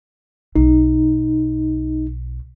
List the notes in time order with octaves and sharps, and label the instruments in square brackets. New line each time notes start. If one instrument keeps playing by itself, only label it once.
[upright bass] B1 [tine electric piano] D#4